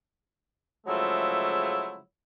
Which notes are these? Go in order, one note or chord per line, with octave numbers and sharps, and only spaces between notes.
C#3 F3 F#3 G#3 A3 E4